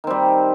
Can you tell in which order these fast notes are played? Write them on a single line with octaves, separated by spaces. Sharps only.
D#3 C4 G3